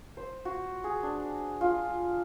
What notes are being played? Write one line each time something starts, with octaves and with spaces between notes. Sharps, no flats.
C5
F#4
G#4
D4
F4